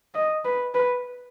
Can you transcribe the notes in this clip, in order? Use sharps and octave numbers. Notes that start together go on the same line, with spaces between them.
D#5
B4
B4